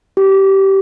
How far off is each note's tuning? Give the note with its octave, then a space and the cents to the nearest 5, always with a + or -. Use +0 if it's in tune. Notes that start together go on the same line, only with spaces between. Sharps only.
G4 -15